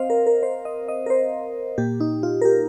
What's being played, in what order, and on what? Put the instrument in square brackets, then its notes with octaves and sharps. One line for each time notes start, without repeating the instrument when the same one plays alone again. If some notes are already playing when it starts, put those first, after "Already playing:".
Already playing: [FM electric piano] C4 C5 D#5 F5
A#4
A#4
C5
D#5
D#5
A#4
C5
A#2 A#3 G4
D#4
F4
A#4
G4